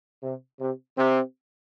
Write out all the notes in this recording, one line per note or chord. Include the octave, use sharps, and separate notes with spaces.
C3
C3
C3